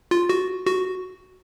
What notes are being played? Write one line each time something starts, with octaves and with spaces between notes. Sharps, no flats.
F4
F#4
F#4